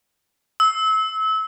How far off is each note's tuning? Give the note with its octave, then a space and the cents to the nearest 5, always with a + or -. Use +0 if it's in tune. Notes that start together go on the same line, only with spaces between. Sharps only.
E6 -30